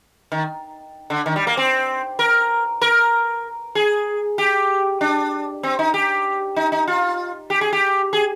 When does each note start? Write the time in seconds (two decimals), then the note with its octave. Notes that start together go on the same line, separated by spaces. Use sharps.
0.32 D#3
1.10 D3
1.26 D#3
1.36 G3
1.47 A#3
1.57 C4
2.19 A#4
2.81 A#4
3.75 G#4
4.38 G4
5.01 D4
5.63 C4
5.79 D#4
5.94 G4
6.56 D#4
6.72 D#4
6.88 F4
7.50 G4
7.61 G#4
7.73 G4
8.13 G#4